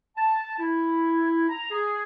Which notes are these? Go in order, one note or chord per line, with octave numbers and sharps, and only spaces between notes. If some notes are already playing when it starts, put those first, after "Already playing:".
A5
E4
A#5
G#4